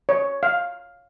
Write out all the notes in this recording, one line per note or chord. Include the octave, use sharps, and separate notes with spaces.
C#5
F5